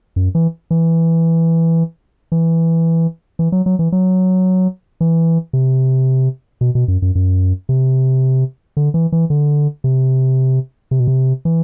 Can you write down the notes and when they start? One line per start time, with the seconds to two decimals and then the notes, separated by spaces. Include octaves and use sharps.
0.16 F#2
0.35 E3
0.71 E3
2.32 E3
3.39 E3
3.52 F#3
3.66 F#3
3.79 E3
3.92 F#3
5.01 E3
5.53 C3
6.61 B2
6.75 B2
6.88 F#2
7.02 F#2
7.15 F#2
7.69 C3
8.77 D3
8.94 E3
9.12 E3
9.30 D3
9.84 C3
10.91 C3
11.00 B2
11.07 C3
11.45 E3